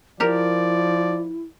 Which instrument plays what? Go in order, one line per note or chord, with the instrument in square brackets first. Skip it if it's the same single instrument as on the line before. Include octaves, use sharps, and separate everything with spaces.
[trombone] F3 [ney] E4 [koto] G4 A#4 [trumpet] D5